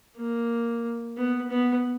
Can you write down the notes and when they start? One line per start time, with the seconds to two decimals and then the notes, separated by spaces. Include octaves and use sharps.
0.17 A#3
1.17 B3
1.50 B3